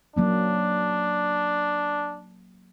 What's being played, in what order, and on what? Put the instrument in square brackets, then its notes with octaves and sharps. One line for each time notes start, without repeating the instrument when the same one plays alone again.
[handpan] F#3 A#3 C#4 [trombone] D4